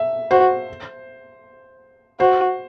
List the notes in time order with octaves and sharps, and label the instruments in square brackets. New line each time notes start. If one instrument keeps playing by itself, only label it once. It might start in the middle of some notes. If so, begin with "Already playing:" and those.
Already playing: [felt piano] E5
[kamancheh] F#4 [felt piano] C5
[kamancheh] F#4 [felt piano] C5